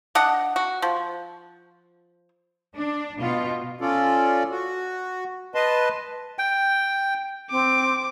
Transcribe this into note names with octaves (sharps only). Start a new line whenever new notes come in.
D4 D#5 F#5
F#4
F3
D4
B2 F4
C#4 F4 A4 D5
F#4
B4 D#5 A5 C6
G5
C4 D6